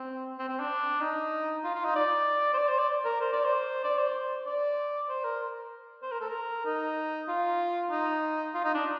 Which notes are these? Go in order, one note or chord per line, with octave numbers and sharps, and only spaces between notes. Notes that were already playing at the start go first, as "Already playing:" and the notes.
Already playing: C4
C4
C4
D4
D#4
F4
F4
D#4
D5
C5
D5
C5
D5
A#4
C5
D5
C5
D5
C5
D5
C5
A#4
C5
A#4
A4
A#4
D#4
F4
D#4
F4
D#4
D4